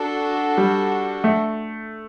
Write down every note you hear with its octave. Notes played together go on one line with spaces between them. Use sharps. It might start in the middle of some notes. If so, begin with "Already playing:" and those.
Already playing: D4 F#4 A4
G3
A3